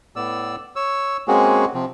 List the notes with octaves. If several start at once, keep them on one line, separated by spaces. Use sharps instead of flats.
A2 B3 D5 E6
C#5 E6
G#3 A#3 C4 C#4 F#4 G#4
C3 F3 C4